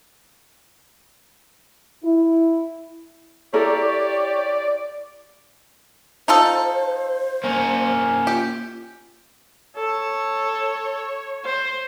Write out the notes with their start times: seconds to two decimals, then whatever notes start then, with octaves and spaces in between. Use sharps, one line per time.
2.04 E4
3.54 E4 G4 A4 A#4 C#5 D5
6.28 D#4 F4 A4 C5
7.44 A#3 C#4
8.27 F4 G4
9.76 A4 C#5
11.45 C5